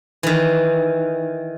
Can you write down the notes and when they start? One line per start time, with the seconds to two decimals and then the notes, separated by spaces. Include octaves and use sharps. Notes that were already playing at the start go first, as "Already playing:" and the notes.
0.23 D#3 E3